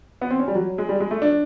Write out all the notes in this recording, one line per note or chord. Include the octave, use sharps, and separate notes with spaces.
B3
C4
C#4
G3
F#3
G#3
G3
G#3
A3
D4